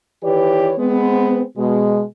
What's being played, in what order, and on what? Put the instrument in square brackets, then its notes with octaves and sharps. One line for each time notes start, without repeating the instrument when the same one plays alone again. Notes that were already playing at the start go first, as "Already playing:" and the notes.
[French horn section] D#3 E3 G4 B4 C#5 D5
G#3 B3 C4
B2 G#3